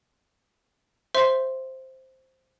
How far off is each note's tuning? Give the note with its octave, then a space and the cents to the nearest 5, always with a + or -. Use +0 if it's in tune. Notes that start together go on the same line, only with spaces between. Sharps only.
C5 +0 E5 +0 C6 +0